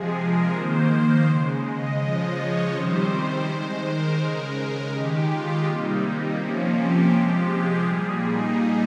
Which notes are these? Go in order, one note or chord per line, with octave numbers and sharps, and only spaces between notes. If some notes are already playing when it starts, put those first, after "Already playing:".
Already playing: C3 F3 G#3 G#4
A#4
D#3 A#3 C5
C#3 G#3
D#5
C#3 F3 G#3 D#5
C#5
C3 D#3 G3 C5
C5
D#3 G#3
A#4
C#3 G#3
D#3 G#3 G4
F4
C3 G3 A#3 D#4
C3 F3 A#3 C#4
G4
C3 F3 G#3
G#4
A#2 G3 A#3 G#4
D#4